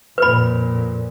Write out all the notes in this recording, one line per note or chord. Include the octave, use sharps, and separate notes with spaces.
F2 A#2 B4 B5